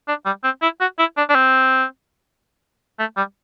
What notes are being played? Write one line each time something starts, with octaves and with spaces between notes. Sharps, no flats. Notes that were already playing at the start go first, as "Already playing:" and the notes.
D4
G3
C4
E4
F#4
E4
D4
D4
C4
A3
G3